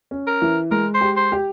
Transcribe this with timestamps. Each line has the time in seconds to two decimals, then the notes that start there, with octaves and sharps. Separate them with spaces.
0.11 C#4
0.27 A#4
0.42 E3
0.71 G#3 A#4
0.94 C5
1.01 G4
1.16 C5
1.32 G4